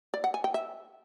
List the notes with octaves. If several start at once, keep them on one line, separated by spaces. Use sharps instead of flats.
D5
F#5
G#5
G5
E5